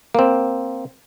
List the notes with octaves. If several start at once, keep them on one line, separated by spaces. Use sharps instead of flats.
A#3 C4